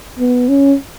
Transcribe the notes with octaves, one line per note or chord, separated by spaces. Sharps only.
B3
C#4